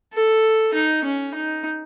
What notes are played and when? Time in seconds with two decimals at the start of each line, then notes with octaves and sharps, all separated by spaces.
0.13 A4
0.74 D#4
1.05 C#4
1.34 D#4